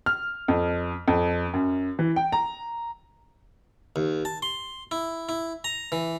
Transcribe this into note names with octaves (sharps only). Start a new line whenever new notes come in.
F6
F2
F2
F#2
E3
G5
A#5
D#2
A5
C6
E4
E4
A#5
E3